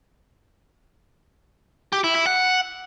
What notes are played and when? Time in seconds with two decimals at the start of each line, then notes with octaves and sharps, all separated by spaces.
1.92 G4
2.04 E4
2.15 E4
2.27 F#5